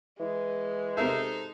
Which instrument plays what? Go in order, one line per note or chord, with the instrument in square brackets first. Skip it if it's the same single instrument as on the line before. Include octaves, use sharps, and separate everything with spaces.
[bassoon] E3 [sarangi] G#3
[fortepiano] C3 A#4 E5 [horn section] D#4 C5 [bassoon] A4